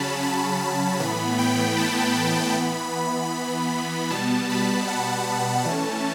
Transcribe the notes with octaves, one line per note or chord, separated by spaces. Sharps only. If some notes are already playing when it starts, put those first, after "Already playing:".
Already playing: C#3 F#3 C#4 A5 B5
B5
B5
A2 E3 B3 B5
G5
A5
B5
E3 B3
B2 G3 B3 A5
B5
F#5
E3 A3 C#4 A5